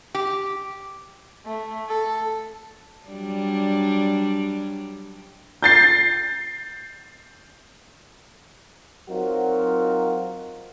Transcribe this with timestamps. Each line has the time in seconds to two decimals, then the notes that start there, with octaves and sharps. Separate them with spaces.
0.15 G4
1.46 A3
1.88 A4
3.08 F#3 G3 D4
5.63 G6 A6 C7
9.09 F#3 C4 D#4 F4 F#4 A#4